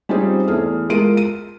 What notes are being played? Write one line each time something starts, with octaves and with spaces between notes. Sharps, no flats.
G3 C4 C#4 D#4 F4 G#4
E2 A3 G#4 F6
G#3 F4 A#4 D7 D#7
D#7